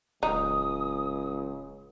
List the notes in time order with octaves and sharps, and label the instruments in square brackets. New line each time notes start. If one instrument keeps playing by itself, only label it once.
[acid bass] D1 [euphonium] C#2 [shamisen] D#4 [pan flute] D#6